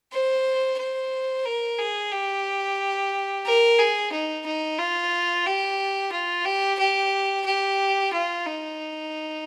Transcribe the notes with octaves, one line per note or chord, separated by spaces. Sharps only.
C5
C5
A#4
G#4
G4
A#4
G#4
D#4
D#4
F4
G4
F4
G4
G4
G4
F4
D#4